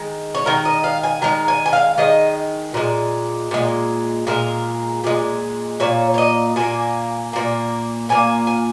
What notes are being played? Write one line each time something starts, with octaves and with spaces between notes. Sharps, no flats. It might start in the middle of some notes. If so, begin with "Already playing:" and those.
Already playing: D#3 G#3
C#5
D#3 G#3 A#4
D#5
F5
G#5
D#3 G#3 A#5
G#5
G#5
F5
D#3 G#3 D#5
A#2 G#3
A#2 G#3
A#2 G#3 A#4
A#2 G#3
A#2 A#3 C#5
C#5
D#5
A#2 A#3 G#5
A#2 A#3
A#2 A#3 G#5
G#5